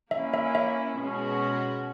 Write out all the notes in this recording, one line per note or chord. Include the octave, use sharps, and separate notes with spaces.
A#3 C#4 E4 E5
E5
E5
B2 G#3 C#4 F#4